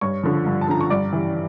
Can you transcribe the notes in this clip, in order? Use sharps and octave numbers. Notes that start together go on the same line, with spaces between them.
G2 C#5 C#6
D3 F3
G2
A5
D3 F3 A#5
C#6
G2 D5 D6
E3 G3